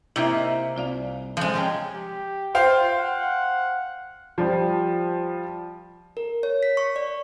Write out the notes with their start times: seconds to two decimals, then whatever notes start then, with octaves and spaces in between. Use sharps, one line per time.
0.16 C3 A#3 D#4 E4 E5
0.76 C2 F4 D5 F5
1.37 D3 F3 G#3 C4
1.54 C3 C#4 G5
1.93 G4
2.55 F4 C5 F5 G5
2.97 F#5
4.38 F3 G3
6.17 A#4
6.43 C#5
6.63 B6
6.77 C#6
6.96 D5